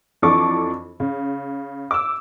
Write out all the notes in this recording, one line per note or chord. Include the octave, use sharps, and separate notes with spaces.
F2 E3 D4 A4 C#6 D6
C#3
D6 E6